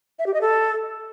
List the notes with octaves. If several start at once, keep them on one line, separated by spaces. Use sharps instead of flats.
E5
G4
D#5
A4